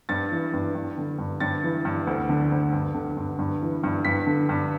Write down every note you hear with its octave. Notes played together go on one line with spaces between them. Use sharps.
G2 A6
E3
G2
G2
D3
G2
G2 A6
E3
G2
D2
D3
D2
G2
D3
G2
G2
E3
G2
G2 B6
D3
G2